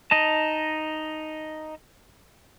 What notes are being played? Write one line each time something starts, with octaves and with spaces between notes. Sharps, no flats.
D#4 D#5 A5